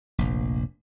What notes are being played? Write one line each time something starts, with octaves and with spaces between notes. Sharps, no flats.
F1 A#1